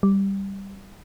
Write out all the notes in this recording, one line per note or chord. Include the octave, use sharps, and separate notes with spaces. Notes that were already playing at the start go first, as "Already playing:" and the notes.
G3